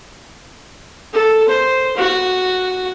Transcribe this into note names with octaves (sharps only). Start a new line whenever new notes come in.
A4
C5
F#4